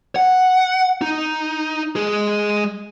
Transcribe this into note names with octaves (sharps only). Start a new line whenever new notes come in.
F#5
D#4
G#3 G#4